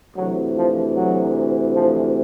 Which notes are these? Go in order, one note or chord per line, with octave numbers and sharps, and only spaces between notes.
D2 C3 E3 F#3
F3
F#3
F3